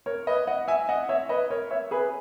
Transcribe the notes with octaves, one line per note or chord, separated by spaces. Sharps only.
A#4 C#5
B4 D#5
D#5 F#5
E5 G#5
D#5 F#5
C#5 E5
B4 D#5
A#4 C#5
C#5 E5
G#4 B4